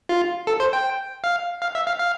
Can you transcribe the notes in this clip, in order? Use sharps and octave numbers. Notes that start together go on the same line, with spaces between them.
F4
A4
C5
G5
F5
F5
E5
F5
F5